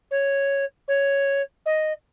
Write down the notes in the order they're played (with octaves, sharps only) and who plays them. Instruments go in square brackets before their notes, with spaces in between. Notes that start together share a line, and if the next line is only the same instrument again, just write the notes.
[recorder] C#5
C#5
D#5